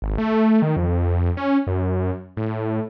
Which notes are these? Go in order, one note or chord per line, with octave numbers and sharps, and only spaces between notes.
G#1
A3
D#3
F2
C#4
F#2
A2